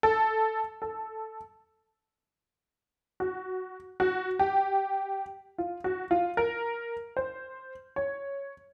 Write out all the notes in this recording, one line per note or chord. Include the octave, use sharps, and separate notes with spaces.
A4
A4
F#4
F#4
G4
F4
F#4
F4
A#4
C5
C#5